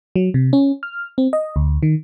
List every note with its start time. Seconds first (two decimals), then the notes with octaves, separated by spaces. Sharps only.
0.16 F#3
0.34 C3
0.53 C#4
0.83 F6
1.18 C4
1.33 D#5
1.56 D2
1.83 D#3